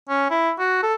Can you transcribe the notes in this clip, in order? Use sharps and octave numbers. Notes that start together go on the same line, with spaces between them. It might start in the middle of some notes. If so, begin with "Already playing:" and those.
C#4
E4
F#4
A4